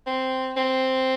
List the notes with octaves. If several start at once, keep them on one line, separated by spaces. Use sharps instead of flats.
C4
C4